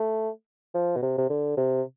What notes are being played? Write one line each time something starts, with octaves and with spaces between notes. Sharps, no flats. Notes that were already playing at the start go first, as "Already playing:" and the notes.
Already playing: A3
F3
B2
C3
C3
D3
C3